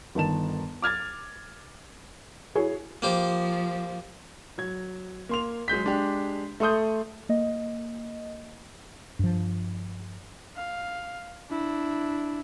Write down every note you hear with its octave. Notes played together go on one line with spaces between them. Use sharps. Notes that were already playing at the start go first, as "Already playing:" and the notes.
G1 D#3 A5 E7
D6 F6 G#6 A6
E4 F#4 G#4 C#5
F3 A#3 G4 C5
F#3 G#6
A#3 C6 F7
F#3 G#3 G6 B6
G#3 D4 G4
A3 A4 C6 D#6 G6
A#3 D#5
G2 F3
F5
D4 E4